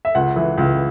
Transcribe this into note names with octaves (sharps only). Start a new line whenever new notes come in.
E5
C#2 F#5
E3
C#2